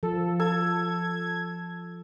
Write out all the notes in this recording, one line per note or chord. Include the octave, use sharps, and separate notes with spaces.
F3 A4
A4 G#6